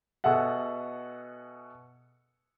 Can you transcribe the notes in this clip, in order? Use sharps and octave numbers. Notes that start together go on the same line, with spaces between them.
B2 G#4 A4 E5 F#5